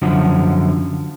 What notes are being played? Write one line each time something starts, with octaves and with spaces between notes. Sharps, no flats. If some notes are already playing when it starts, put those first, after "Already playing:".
F#2 D3 F3